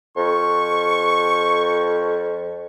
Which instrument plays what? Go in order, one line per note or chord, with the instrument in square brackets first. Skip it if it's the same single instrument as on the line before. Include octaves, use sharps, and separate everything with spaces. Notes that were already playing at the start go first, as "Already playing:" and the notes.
[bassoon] F2 [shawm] C#6